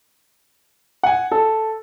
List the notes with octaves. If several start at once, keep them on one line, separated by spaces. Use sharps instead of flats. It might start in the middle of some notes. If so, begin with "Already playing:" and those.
F#5 G#5
A4